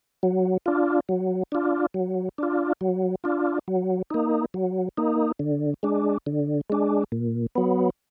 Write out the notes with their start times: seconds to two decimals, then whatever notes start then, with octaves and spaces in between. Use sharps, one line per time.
0.23 F#3
0.66 D4 F4
1.09 F#3
1.52 D4 F4
1.94 F#3
2.38 D4 F4
2.81 F#3
3.24 D4 F4
3.68 F#3
4.10 A#3 D#4
4.54 F#3
4.97 A#3 D#4
5.39 D3
5.83 G#3 D4
6.26 D3
6.70 G#3 D4
7.12 A#2
7.55 F#3 B3